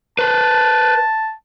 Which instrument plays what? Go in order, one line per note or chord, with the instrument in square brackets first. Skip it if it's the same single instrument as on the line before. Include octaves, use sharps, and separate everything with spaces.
[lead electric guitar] B4 C5 [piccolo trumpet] A5